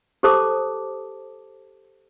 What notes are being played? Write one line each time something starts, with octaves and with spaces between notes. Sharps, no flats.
G4 A4 C5 A5 D6 D#6